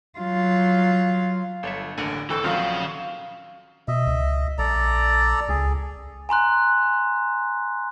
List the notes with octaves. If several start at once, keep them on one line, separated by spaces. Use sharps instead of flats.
F#3 F4
G1 A4 C#5 E5
A1 D#2 D3 A#4 F#5 G#5
G#1 E3 C4 A4 G5 C#6
A#1 D#3 F3 F#3 C4 C#4 F5
B2 D#5 E5
C#2
A#1 A4 D5 A#5
C#2 G#4
G#5 A#5 C6 F#6